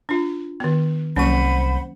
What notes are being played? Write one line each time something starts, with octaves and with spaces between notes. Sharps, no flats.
D4 F4
D#3 B3
C2 F#3 A#3 C#4 C5 F#5 B5 D#7